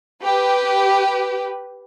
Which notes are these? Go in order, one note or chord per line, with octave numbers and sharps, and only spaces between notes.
G4 B4